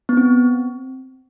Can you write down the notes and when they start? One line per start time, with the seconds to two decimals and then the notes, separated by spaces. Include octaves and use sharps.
0.09 B3
0.17 C4